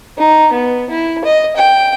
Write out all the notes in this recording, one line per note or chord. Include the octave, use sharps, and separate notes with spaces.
D#4
B3
E4
D#5
G5